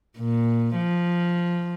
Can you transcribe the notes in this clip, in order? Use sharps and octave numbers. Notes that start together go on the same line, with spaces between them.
A#2
F3